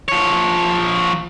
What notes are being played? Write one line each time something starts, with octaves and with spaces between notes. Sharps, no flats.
F3 C#5